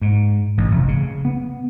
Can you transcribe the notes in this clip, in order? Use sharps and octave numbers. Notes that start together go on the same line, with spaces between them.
G#2
A1
F1
C#3
B3